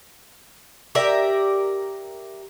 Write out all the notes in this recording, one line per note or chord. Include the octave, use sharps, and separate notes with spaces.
G4 A#4 D5 E5